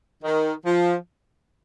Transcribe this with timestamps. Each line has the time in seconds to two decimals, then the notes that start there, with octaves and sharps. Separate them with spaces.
0.23 D#3
0.65 F3